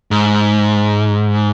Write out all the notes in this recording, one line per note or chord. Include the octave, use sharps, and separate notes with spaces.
G#2